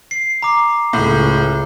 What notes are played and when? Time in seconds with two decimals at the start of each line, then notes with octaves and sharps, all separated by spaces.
0.11 C7
0.42 A#5 D6
0.93 C#2 A2